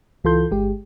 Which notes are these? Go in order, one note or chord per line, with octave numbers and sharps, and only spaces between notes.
C#2 E3 F4 A4 C6 G6
G1 G#3 G4